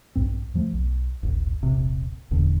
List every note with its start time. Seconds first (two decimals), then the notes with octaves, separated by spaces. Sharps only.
0.15 A#1 G2 C4
0.54 F2 F3 A3
0.74 B1
1.23 D1 G#1 F#2
1.63 E1 A#1 C3
2.31 F1 E2 A#2 D3